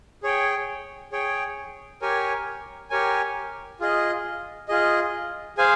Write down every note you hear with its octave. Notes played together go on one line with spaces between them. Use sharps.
G#4 C#5 G5
G#4 C#5 G5
G4 A#4 C#5 G#5
G4 A#4 C#5 G#5
F4 G#4 D#5
F4 G#4 D#5
G#4 C5 F5 G#5